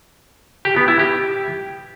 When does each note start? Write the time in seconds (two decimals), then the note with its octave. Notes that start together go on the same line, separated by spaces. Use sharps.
0.65 G4
0.76 B3
0.88 E4
0.99 G4